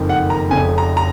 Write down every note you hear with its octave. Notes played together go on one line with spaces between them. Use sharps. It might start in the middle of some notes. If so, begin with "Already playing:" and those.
Already playing: F#1 F2 D#3
F#5
A#5
F1 F2 C#3 G#5
A#5
A#5